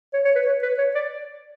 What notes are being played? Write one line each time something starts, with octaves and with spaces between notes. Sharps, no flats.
C#5
C#5
B4
C#5
B4
C#5
D5